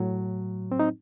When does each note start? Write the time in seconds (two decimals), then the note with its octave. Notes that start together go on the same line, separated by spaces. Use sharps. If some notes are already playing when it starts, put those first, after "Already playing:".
Already playing: A2 F#3
0.72 C4
0.80 D#4